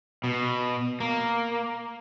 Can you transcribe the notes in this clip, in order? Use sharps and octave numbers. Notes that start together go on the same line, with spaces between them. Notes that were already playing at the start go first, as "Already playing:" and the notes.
B2
A#3